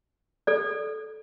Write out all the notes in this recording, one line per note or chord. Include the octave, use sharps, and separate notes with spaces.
A4 D5